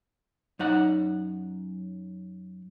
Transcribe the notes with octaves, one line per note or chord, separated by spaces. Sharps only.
F#2 D#4 F#5